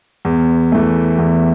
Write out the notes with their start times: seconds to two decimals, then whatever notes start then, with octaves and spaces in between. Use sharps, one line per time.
0.25 E2
0.72 E3 A3
1.19 E2